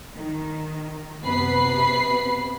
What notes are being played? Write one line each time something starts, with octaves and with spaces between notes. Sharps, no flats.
D#3
F#2 C3 B3 B4 B5 C7